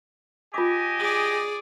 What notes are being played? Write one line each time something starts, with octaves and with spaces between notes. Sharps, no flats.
F4 G4 D#5 G#5 D6
G#4 D5